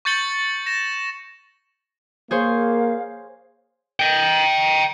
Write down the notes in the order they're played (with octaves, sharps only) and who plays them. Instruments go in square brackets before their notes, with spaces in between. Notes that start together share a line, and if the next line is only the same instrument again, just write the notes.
[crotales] C#6 G6 A6 C#7 F#7 G7
A#6 E7
[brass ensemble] A#3 [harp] G#4 C5 C#5 [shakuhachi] F5
[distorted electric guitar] D#5 G5